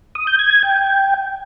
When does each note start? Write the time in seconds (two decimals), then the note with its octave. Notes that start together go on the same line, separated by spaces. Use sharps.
0.15 D#6
0.27 G6
0.39 G#6
0.51 G#6
0.63 G5